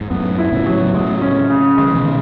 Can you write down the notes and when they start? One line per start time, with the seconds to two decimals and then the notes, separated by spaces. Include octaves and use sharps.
0.01 G#2
0.10 F#2 A2 B3
0.38 E4
0.52 A2 C#3
0.66 F#3
0.86 B2
0.94 A2 C#3 G#3
1.22 C#4
1.50 C#3
1.77 D#3 G#3
1.87 E3
1.95 B2 D#3